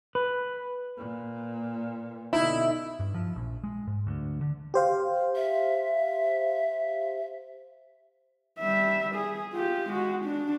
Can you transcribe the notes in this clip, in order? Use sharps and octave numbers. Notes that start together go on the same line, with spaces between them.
B4
A#2
B2 D3 D#4 E4
G2
F3
A#1
G#3
G#2
D2
D3
G4 C5 F5
E5
G3 E5
G#4
F4 G4
G#3 F#4
D4